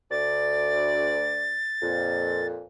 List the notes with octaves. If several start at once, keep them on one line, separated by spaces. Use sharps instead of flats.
D2 D5 A6
F2 A#2